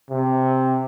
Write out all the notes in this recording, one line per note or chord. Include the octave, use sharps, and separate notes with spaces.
C3